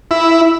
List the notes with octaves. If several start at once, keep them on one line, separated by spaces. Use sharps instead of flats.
E4